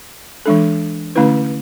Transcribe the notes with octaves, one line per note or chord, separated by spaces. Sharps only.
E3 G#3 D4 A4
D3 A3 C#4 E4 B4